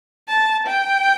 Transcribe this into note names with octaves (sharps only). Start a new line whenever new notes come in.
A5
G5